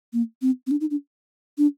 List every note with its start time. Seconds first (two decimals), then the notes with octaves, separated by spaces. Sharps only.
0.13 A#3
0.42 C4
0.67 C4
0.71 D4
0.81 D#4
0.91 D4
1.58 D4